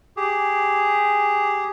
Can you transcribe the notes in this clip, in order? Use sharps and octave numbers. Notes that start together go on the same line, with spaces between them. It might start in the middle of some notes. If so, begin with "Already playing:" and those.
G4 G#4